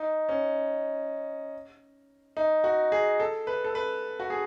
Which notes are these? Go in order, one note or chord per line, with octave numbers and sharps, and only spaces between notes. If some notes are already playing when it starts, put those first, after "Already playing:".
Already playing: D#4
C#4
D#4
F#4
G#4
A4
B4
A4
B4
F#4
G#4